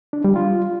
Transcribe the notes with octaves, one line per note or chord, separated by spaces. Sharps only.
D4
G3
F4